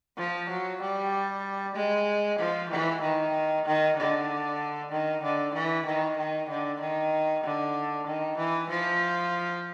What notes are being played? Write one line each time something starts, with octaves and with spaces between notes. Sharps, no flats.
F3
F#3
G3
G#3
F3
E3
D#3
D#3
D3
D#3
D3
E3
D#3
D#3
D3
D#3
D3
D#3
E3
F3